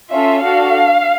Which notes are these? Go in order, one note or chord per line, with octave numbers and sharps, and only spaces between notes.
C#4 F4 A4 E5
D4 F#4 A4 F5